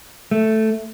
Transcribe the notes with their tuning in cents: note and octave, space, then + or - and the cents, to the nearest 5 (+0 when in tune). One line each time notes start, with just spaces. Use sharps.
A3 +0